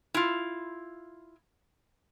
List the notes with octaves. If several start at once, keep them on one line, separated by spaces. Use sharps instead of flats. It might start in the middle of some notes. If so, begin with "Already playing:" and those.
E4 F4